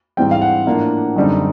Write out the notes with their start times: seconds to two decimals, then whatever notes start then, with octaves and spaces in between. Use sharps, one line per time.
0.17 G#2 E3 G3 C4 G5
0.31 F5
0.41 F#5
0.66 A2 F3 A#3 D4 F4
1.16 F#2 D3 G3 C4 D#4